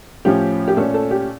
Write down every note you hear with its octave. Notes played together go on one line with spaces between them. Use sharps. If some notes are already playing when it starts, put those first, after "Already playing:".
A2 F3 C#4 G4
G4
A#2 A3 C#4 A4
A4
G4